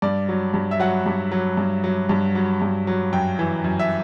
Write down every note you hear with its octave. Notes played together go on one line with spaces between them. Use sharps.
G2 D5
F#3
G2
E5
F#3 F#5
G2
F#3
G2
F#3
G2
F#3
G2
F#3
F#2 G5
E3
F#2
E5